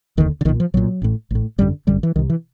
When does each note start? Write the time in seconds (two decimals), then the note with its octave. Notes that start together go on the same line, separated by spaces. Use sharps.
0.17 F1 D#2 D3 D#3
0.41 D3
0.45 B1 D#3
0.49 A#2
0.60 F3
0.74 B1 A#2 F#3
1.02 A1 A2
1.31 A1 A2
1.58 G#1 F#2 D3 G3
1.87 G#1 F#2 D3 G3
2.03 E3
2.16 C2 D#3
2.19 C3
2.30 E3